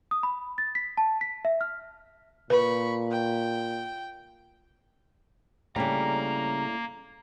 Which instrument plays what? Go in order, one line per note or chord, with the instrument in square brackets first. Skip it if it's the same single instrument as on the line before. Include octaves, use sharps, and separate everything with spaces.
[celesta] D#6
B5
A6
B6
A5
B6
E5
F6
[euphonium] A#2 [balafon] B4 [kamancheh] B5 C#6
[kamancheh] G5
[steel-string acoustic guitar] A2 D4 [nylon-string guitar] C#3 G3 [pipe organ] A#3 [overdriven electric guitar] A#5